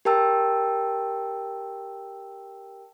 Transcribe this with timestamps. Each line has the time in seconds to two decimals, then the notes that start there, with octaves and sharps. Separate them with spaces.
0.05 G4 A#4 G5 A5 E6